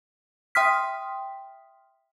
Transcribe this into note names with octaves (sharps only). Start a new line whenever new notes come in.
E5 G5 C6 D#6 F6 B6